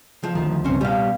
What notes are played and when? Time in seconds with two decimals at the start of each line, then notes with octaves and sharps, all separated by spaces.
0.24 F3
0.35 D2 D#3 F3
0.64 C#2 G2 C4 C#4
0.81 B2 G3 F5